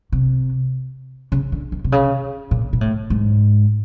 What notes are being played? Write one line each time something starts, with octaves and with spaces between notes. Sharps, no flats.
C3
C#3
D3
D#3
C3
C#3
A#2
A#2
A2
G#2